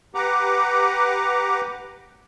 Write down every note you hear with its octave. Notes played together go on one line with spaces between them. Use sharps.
G4 B4 F#5 A#5 D6